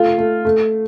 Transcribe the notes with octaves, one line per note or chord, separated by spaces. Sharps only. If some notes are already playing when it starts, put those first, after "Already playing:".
Already playing: A3 F4
A3
A3